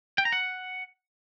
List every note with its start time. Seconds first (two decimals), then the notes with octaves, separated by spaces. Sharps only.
0.18 G5
0.25 A#5
0.32 F#5